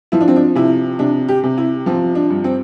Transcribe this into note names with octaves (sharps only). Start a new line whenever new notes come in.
F3 E4
D4
C4
D4
C3 E4
C3 D4
G4
C3
E4
F3 C4
D4
G2
C4